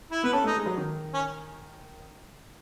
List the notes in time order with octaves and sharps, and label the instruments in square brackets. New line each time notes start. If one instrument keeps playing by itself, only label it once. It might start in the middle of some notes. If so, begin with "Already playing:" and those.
[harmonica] E4
[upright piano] B3 [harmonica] B4
[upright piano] C#4 [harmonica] A4
[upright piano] A3
[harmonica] D#4
[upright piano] G#3
F#3
D#3
[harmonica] C#4